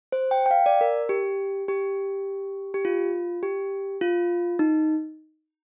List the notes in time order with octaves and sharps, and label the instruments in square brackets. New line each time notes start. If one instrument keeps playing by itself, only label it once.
[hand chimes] C5
G5
G5
F5
D5
A#4
G4
G4
G4
F4
G4
F4
D#4